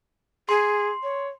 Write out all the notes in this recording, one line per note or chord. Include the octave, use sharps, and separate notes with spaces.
G#4 C6
C#5